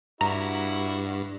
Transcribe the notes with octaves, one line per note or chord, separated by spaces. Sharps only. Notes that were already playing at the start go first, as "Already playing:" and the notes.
G2 E4 F#4 A#5